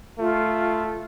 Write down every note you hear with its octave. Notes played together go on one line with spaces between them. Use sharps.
A3 F4